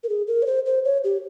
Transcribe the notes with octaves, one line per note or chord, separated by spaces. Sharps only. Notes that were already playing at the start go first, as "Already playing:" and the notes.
A#4
G#4
A#4
C#5
C5
C5
C#5
G4